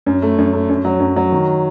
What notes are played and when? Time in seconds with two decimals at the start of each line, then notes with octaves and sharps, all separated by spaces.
0.06 F#2
0.22 A3
0.38 F#2
0.53 A3
0.69 F#2
0.85 F#3
1.00 F#2
1.16 F#3
1.32 D#3